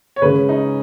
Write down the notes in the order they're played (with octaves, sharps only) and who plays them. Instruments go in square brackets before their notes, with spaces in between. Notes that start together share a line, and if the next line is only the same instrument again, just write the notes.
[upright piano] C#5
[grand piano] C#3 G#3 C#4 [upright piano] B4
[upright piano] D#4